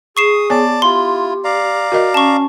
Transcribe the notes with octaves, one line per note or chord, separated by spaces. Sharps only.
G#4 C#6 D#6 C7 E7
B3 C#5 D5 G#5 A5
E4 F4 G4 C6
D5 F5 A#5
F#4 A#4 D#5
C#4 A5 C#6